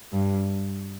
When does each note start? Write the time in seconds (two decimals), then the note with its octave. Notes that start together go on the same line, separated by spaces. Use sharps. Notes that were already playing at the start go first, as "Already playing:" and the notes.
0.13 G2